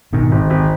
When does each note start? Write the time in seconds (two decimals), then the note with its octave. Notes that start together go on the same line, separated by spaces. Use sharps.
0.13 G#2 B2 D#3
0.32 G#1
0.50 G#1